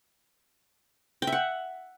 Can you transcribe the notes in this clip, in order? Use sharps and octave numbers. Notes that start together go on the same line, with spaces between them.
G5
E5
F#5